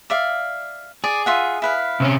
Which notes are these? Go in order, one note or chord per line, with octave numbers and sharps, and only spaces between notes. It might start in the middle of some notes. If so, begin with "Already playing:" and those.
D5 E5 F5
G#4 D5
F4 E5 F#5
E4 B4 F5
C3 C4 C#4